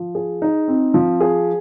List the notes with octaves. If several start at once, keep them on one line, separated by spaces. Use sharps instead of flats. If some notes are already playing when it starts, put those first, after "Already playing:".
Already playing: F3
G#4
D#4
C4
F3
G#4